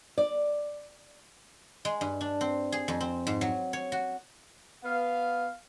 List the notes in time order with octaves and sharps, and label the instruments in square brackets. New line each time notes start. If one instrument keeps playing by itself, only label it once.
[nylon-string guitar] D5
[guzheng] G#3
G2
D4
C4
G#4
F2
C4
G#2
F#3
C#5
F#4
[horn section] B3 F5